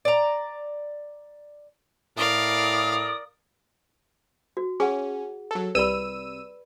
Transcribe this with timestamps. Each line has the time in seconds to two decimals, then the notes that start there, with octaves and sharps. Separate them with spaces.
0.05 D5 A#5
2.17 A2 A#4 D5 F5 D#6
4.57 F#4
4.80 C#4 G#4 F#5
5.51 F#3 A4
5.75 C2 B4 D5 B5 E6 D#7